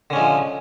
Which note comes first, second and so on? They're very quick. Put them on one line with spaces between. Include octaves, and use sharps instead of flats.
D3 C#4 G#3 F3